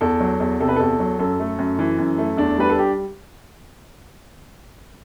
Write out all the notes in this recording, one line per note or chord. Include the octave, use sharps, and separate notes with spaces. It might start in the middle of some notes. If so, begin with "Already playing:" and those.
E2 A4
F#3
E2
C3 A4
B4
E2 A4
F#3
F#2 A4
A3
F#2
E3
F#2
A3
E2 D4
G3 B4
A4
G4